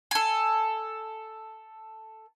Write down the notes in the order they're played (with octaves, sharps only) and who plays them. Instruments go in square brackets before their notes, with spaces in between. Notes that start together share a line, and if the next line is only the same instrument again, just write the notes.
[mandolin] A4 G#5